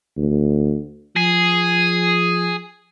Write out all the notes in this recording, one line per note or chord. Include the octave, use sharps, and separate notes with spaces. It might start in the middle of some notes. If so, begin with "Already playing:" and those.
D2
F3 G#4